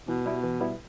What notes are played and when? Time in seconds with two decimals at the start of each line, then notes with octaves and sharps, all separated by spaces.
0.08 B2 E3
0.26 G3 B3 E4
0.44 E3
0.60 G3 B3 E4